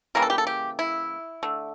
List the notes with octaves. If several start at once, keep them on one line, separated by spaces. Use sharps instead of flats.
C#3 E3 G3 A#3 A#4
A4
G4
A4
G4
E4
D3 A3